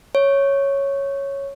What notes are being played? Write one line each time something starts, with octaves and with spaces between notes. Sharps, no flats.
C#5